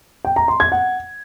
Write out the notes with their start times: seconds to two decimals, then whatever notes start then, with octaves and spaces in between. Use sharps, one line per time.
0.25 G5
0.36 A#5
0.48 C6
0.60 G#6
0.72 F#5